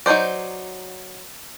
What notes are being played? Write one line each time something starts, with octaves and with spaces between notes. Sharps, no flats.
F#3 D#4 A#4 C5 D5